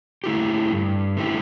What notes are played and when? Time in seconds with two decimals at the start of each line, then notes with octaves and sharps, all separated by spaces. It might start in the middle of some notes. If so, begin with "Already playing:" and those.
0.24 D3 A3 E4 G4
0.71 G2
1.17 D3 A3 E4 G4